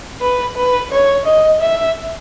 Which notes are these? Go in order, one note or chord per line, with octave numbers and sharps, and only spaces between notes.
B4
B4
C#5
D#5
E5